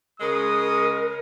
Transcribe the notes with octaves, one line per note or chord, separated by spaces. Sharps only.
C#3 G#3 A#4 D#6